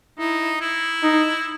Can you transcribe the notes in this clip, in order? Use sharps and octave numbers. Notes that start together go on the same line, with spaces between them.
D#4 E4
E4
D#4